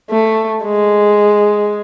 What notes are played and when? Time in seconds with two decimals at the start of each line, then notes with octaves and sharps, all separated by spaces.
0.11 A3
0.64 G#3